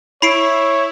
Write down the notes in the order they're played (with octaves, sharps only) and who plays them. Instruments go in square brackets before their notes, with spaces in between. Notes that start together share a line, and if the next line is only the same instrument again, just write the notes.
[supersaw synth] E4 [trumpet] C#5 [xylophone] B5 C7 D7